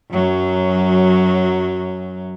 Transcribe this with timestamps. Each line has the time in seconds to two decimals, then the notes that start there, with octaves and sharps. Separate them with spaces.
0.11 F#2 F#3